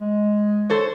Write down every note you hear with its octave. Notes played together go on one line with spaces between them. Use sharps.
G#3
A4 C5 C#5